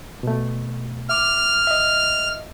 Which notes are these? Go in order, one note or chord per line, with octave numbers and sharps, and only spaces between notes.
B2 A3
E5 D6 F6
D#5 E5